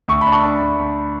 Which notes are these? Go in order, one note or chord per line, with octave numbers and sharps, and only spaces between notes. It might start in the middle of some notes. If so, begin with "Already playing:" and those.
D2 C#6
B5
D4
A5 C#6
D4
D2
D2